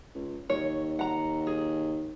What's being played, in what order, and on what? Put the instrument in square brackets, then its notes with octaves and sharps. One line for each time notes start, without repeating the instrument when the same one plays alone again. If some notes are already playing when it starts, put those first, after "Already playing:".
[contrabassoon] C#2
[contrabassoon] D#2 [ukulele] C#5
[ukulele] F#5 A#5
G#4